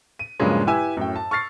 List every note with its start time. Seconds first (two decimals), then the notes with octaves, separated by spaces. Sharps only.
0.19 D#7
0.40 G2 A#2 C#3 F3 F#3 G#3
0.67 E4 G4 B4 E5 G#5 E6
0.97 F#2 A2 G5
1.16 A5
1.31 C#6 F6 A6 C7